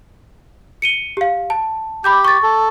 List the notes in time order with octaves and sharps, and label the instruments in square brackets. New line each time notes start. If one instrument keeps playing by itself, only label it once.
[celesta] C#7 D#7 G7
G4 F5
A5
[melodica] G4 [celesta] B5 D6 G6
[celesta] C#6 A6
[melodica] A4